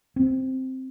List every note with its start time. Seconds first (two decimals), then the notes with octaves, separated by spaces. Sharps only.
0.16 C4